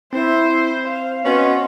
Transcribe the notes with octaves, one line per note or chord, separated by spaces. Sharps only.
C4 E4 C5
C5 F5
B3 C#4 F#4 D#5 C6